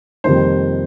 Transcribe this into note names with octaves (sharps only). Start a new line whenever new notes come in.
F2 C3 D#3 G3 A#3 C5